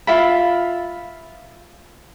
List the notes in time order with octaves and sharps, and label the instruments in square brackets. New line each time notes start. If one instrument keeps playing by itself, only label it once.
[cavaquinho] F4 E5 B5